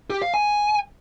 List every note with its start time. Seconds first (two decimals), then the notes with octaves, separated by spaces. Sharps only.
0.10 G4
0.22 F5
0.34 G#5